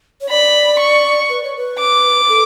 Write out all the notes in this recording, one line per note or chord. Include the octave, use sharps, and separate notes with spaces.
C#5
D5 B5
C#6
B4
C#5
B4
D6
A4